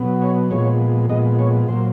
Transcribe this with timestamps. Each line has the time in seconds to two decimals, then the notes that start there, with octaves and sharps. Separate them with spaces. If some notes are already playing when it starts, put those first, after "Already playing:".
Already playing: B2 F#3 B3
0.22 C#5
0.51 A#2 F3 G#3 B3 C#5
1.09 A#2 F3 G#3 B3 D#5
1.39 C#5
1.68 A#2 F#3 A#3 C5